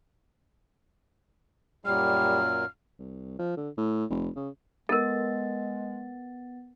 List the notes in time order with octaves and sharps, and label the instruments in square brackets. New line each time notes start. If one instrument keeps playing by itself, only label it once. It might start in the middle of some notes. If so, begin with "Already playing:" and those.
[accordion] F#2 A#2 F#3 [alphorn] G3 [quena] F6
[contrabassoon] C2
F3
D3
A2
F1
C#3
[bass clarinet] G#3 [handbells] B3 A6 [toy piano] A4 A#4